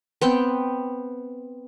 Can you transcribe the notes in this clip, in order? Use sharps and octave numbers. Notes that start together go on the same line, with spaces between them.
B3 C4 G5